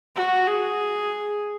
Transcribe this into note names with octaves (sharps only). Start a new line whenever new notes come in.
F#4
G#4